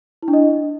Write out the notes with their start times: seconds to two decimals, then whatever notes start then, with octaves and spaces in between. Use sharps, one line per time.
0.22 E4
0.28 D4
0.33 D#5